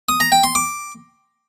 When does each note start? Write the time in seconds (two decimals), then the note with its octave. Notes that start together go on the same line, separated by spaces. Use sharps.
0.09 D#6
0.20 A#5
0.32 G5
0.44 C6
0.55 D6